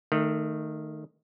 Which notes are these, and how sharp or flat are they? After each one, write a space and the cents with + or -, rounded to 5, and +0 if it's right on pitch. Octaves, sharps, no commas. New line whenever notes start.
D#3 -10 A3 +15